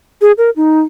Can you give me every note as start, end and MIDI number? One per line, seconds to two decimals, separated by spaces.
0.22 0.32 68
0.38 0.50 70
0.56 0.81 63